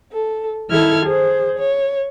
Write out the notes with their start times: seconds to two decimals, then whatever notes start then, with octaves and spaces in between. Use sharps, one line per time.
0.12 A4
0.70 D#3 E4 A4 F6 G#6
1.06 G#4 C5
1.58 C#5